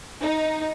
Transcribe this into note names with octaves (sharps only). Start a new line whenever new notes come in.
D#4